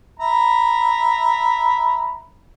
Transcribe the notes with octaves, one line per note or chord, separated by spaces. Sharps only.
E5 A#5 B5